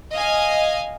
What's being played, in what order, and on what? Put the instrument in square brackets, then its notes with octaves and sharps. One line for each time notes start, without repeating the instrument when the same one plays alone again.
[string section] D#5 F5 G#5